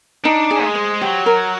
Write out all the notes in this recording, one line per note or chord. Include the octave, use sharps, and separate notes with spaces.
D4 D#4
G#4
G#3
C5
F#3 G4
A#4